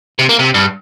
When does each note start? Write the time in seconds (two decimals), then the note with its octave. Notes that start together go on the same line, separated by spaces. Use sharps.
0.19 C3
0.29 A#3
0.39 C3
0.54 G2